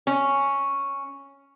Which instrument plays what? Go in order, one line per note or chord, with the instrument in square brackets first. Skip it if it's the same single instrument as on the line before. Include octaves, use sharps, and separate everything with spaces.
[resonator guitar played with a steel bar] C#4